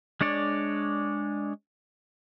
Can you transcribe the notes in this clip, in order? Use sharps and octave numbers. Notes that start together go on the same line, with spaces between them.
G#3 D4 C#5 D5